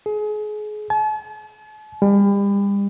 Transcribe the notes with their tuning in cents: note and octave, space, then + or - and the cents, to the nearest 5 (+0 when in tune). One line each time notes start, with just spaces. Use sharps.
G#4 +30
A5 -45
G3 +35